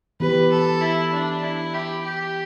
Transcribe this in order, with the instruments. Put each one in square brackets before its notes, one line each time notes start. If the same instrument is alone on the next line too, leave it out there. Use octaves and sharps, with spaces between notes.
[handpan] E3 B3 G4 [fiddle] B4
[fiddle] A4
E4
D4
E4
G4
G4